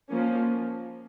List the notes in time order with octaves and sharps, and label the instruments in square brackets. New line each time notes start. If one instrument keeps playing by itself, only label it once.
[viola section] F3 A#3 C#4